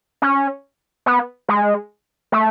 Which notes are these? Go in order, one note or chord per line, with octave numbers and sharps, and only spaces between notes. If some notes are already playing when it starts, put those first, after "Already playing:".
C#4
B3
G#3
A3